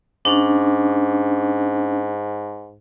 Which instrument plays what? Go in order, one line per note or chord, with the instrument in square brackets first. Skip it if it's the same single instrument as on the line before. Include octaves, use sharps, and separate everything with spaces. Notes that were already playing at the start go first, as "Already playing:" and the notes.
[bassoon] G#2 [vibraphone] C#4 D4